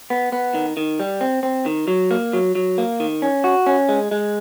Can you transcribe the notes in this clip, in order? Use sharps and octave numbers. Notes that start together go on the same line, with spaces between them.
B3
B3
D#3
D#3
G3
C4
C4
D#3
F#3
A#3
F#3
F#3
A#3
D#3
C#4
F#4
C#4
G#3
G#3